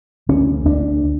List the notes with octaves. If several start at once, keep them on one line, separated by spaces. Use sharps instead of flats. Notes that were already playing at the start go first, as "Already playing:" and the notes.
D2 C#4
D2 D4